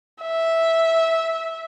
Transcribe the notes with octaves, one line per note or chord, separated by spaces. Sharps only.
E5